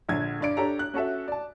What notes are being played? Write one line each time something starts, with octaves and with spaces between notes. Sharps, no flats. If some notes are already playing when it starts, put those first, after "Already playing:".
A#1 D3 G#6
G2 D5 D7
D4 G4 A4 C#5 D5 A#5
F#6
C#4 F#4 A4 E5
D5 A5